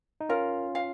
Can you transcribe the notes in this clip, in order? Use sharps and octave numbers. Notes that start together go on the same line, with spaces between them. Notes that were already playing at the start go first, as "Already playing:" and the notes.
D#4
C#4 F4 A#4
F5